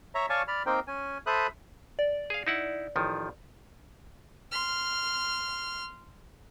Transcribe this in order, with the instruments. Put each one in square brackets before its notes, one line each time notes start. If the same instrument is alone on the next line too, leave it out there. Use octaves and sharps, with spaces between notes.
[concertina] C#5 E5 A#5
C#5 D5 F5 G#5 A5 C#6
D5 B5 F6
A#3 C4 D#4 A#4 C5 G5
C#4 G#5
A4 C5 E5 B5 D#6 F#6
[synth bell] D5
[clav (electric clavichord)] G#4 F5
D#4 E4 F#5
A1 D#3 F3
[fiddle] C6 F6